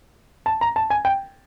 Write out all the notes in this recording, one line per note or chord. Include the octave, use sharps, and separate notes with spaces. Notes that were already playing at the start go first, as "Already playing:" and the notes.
A5
A#5
A5
G#5
G5